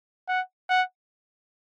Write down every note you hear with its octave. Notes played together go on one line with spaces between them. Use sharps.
F#5
F#5